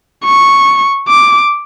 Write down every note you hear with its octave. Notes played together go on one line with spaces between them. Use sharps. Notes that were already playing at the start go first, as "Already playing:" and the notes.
C#6
D6